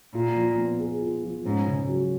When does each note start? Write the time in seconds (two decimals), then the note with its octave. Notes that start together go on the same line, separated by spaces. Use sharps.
0.15 A#2 F4
0.36 F3
0.58 B3
0.80 G#4
1.02 F4
1.23 F3
1.45 G#2 C#4
1.67 C#3
1.88 F#3